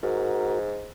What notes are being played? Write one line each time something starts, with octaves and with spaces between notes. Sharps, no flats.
G#2 F#4 A#4